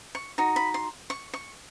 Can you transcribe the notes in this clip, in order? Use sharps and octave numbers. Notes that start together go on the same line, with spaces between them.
C#6
D#4 F#4
B5
C6
C#6
C#6